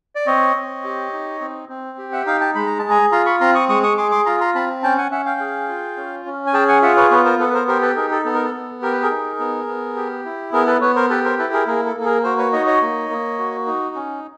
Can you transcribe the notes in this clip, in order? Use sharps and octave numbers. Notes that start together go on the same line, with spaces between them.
D5
C4 C#5 D#5
C4
G4
D#4
C4
C4
G4
E5 F#5
D#4 F5 G5
G5 A5
G#3 B5
A#5
A5
G#4
G#5 A#5
F4 A#5 C6
B5 C#6
C4 A#5 C6
C#6 D#6
G#3 C#6 D#6
C#6 D#6
G#4 C6 D6
C6 D6
F4 A#5 C6
A#5 C6
C4 A5 B5
C#4 G5 A5
F#5 G#5
C#4 E5 F#5
F5 G5
G#4
F4
C#4
C#4
G#5
G#4 G5 A5
F#5 G#5
F4 E5 F#5
B4 C#5
B3 B4 C#5
A#4 C5
B3 A4 B4
B4
A#4 C5
G4 A#4 C5
A4 B4
D#4 G#4 A#4
A4
B3 A4
A#4
A4
B3
G4 A#4
B4
G#4 A#4
D#4
B3
B3
G4
E4
B3 G#4 A#4
A4 B4
B3 B4 C#5
A#4 C5
G4 A4 B4
A#4 C5
E4 A4 B4
G#4 A#4
A#3 G#4 A#4
A4
A#3
A4
G#4 A#4
F#4 A#4 C5
B4 C#5
D#4 C#5 D#5
C#5 D#5
A#3
A#3
F#4
D#4
C#4